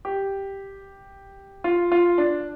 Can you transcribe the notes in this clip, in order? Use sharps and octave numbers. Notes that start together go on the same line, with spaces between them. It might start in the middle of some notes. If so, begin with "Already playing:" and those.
G4
F4
F4
D4